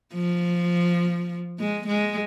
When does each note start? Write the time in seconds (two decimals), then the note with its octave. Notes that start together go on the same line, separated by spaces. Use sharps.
0.14 F3
1.59 G#3
1.87 G#3